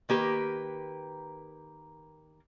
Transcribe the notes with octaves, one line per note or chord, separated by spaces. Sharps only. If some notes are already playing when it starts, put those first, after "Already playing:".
D#3 A#3 G4 B4